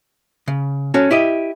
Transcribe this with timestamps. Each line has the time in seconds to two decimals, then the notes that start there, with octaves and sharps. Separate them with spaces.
0.48 C#3
0.94 C#4 F#4 A4
1.11 E4 G4 D#5